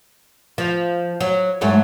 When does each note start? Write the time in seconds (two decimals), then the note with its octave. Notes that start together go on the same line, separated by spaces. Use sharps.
0.58 F3
1.21 F#3
1.61 G#2 F#3 A3